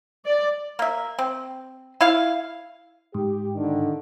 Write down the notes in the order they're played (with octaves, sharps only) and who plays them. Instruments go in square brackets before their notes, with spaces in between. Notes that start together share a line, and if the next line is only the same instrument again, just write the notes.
[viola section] D5
[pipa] A#3 E5
C4
E4 F5
[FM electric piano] G#2 [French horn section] G4
[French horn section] D3 D#3 D4